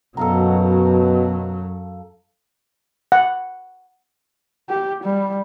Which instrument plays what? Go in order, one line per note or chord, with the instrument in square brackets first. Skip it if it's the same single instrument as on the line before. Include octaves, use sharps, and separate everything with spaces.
[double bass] F#2 F#3 [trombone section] B2 [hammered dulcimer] A4 F5 A#5
[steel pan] F#5
[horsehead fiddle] G4
G3